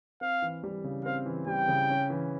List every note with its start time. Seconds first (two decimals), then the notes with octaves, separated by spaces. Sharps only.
0.21 C4 F5
0.42 E3
0.64 G3
0.84 C#3
1.05 C4 F5
1.26 E3
1.47 G3 G5
1.68 C#3
1.90 C#4
2.10 E3